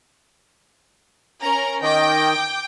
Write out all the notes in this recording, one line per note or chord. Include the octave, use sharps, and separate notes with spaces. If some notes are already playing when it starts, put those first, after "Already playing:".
C#4 A#4 A#5
D#3 D#5 G5 D6